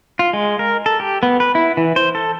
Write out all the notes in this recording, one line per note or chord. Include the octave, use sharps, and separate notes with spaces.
F4
G#3
A#4
A4
G4
B3
B4
E4
E3
C5
A4